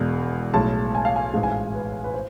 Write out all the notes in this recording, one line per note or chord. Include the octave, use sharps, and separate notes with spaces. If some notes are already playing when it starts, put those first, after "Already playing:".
Already playing: E1 E2 B2 G#3
B1 A2 G#3 A5
G#5
F5
G#5
A1 G#2 G#3 F5
G#5
F5
B4
B4
C5